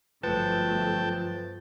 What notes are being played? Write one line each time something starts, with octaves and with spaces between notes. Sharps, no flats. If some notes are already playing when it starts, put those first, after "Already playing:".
G1 F#2 F3 A3 B4 G5 A5